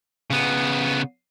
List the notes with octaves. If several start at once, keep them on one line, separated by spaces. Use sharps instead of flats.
C#3 B3